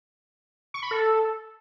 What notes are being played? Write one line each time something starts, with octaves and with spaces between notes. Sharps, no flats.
C#6
B5
A4